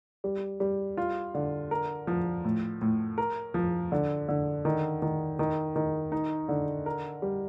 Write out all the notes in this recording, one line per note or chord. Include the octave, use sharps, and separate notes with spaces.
G3
G3
F4
D3
A#4
F3
A2
A2
A#4
F3
D3
D3
D#3
D#3
D#3
D#3
D#4
D3
A#4
G3